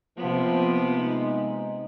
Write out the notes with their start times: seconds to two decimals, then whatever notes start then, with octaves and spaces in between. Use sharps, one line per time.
0.17 C3 F3 A#3 B3
0.96 G#3 C4 D#4